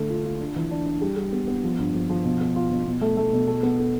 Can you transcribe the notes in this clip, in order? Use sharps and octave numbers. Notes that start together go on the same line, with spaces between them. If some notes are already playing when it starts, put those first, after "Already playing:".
Already playing: D3 A3
F4
F4
D4
E3
D4
D4
G3
G3
B3
B3
F3
G2
F3
F3
B2
B3
F4
B2
B2
A3
A3
B2
A4
B3
A4